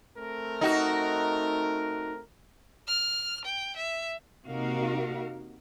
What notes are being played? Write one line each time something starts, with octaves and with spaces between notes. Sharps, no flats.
A3 C4 A#4
D#4 F#4
F6
G5
E5
C3 A#3 D#4 F#4 A#4 F5